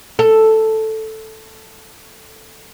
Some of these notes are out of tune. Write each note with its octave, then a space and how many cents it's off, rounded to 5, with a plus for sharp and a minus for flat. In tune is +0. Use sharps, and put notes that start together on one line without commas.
A4 +0